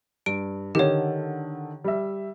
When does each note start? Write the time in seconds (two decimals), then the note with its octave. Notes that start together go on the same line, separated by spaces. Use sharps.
0.26 G2 D7
0.75 D3 D#3 G4 C#5
1.84 G3 E5